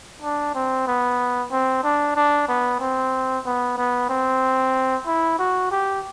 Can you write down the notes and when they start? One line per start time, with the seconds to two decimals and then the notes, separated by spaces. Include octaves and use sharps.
0.22 D4
0.55 C4
0.87 B3
1.52 C4
1.84 D4
2.16 D4
2.48 B3
2.80 C4
3.46 B3
3.78 B3
4.10 C4
5.07 E4
5.39 F#4
5.71 G4